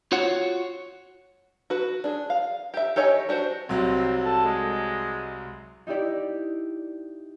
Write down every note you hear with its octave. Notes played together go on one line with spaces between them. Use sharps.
F4 F#4 C#5 F#5
F#4 B4
D4 G#4
F5
G4 E5
G4 A4 C#5 D#5 G#5
D4 F#4 G4 C5
C2 F#3 C4
A4
G#3
D#4 E4 G4 D5